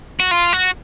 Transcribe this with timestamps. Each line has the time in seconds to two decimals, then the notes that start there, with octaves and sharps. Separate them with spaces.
0.20 F#4
0.31 F4
0.53 F#4